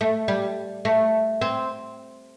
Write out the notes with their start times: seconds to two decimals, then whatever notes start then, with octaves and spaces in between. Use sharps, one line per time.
0.01 A3
0.28 G3
0.85 A3
1.41 C4